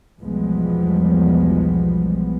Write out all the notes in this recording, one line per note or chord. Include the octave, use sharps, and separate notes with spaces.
B1 E2 F3 G3 G#3 B3